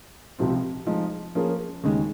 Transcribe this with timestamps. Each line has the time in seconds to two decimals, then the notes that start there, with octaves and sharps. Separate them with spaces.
0.39 C#2 C3 F3 C4
0.87 F3 G#3 D#4
1.35 F3 A#3 C#4 G#4
1.83 D#2 C#3 G#3